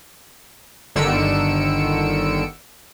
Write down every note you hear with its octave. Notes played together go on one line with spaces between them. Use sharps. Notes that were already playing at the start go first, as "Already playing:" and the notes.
G1 D3 D#3 E6 C#7 D7